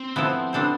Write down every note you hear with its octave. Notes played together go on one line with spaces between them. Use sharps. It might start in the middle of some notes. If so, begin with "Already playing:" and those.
Already playing: C4
F3 B3 E4 A4
B3 D4 A4 C5